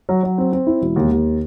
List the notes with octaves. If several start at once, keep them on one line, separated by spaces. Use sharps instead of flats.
F#3
F#3
C4
C4
E4
E1
D#2
D#2